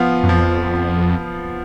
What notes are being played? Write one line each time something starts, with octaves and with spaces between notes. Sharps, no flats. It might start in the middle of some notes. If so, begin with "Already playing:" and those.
Already playing: F3 B3 F4
F#2
F2 F3